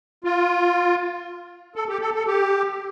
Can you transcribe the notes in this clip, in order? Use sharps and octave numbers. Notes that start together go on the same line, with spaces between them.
F4
A4
G4
A4
A4
G4